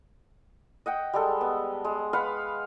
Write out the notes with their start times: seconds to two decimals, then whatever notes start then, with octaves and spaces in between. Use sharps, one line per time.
0.86 D#5 F#5 G5
1.13 G3 G#3 A4
1.41 B3
1.85 G#3
2.13 B4 F5 F#5 B5